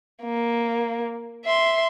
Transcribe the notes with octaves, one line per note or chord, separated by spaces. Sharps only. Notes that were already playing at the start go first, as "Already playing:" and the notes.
A#3
E5 C6